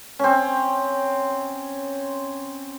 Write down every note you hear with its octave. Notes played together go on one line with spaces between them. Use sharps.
C4 C#4